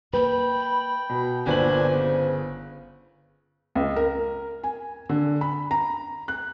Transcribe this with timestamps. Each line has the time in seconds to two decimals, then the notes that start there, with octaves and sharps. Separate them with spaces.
0.13 A#3 B4 G5 B5
1.09 B2
1.46 G1 A#2 A#3 D4 B4 C5 G#5 F#7
1.92 C#3
3.75 C#2
3.96 A#4
4.64 G#5
5.09 D3
5.41 B5
5.71 A#5
6.28 F#6